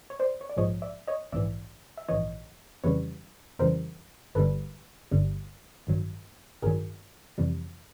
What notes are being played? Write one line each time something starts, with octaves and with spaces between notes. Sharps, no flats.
C#5
C5 D5
C#5
D5
A#1 G#2 F3 G#3 C#5 D#5
D5 E5
C#5 D#5
A#1 G#2 E3 D5 E5
E5
A#1 G#2 E3 C#5 D#5
F2 C#3 E3 G3 B4 C#5
F2 C#3 E3 G3 A#4 C5
G1 G2 D3 G3 A4 B4
G1 G2 D3 G3
A1 G2 D#3 F#3
A1 G2 D#3 F#3 G#4 A#4
F2 C3 E3 G3